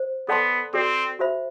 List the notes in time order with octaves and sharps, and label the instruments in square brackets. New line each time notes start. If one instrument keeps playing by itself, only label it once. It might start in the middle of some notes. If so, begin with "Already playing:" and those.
Already playing: [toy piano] C5
[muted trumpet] B3 [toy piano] A4 D5 F#5 A5 C6
[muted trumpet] C4 [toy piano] F#4 A4 D5
[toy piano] F#4 C5 E5 B5